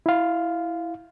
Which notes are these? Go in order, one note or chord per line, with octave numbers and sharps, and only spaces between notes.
E4 F5